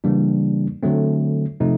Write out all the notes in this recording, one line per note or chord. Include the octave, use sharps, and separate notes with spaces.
C#3 E3 G3 A#3 D4
D3 F#3 A3 C4
C3 F3 A3 C4 D#4